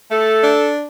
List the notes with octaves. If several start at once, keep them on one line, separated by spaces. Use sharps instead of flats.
A3 A4
D4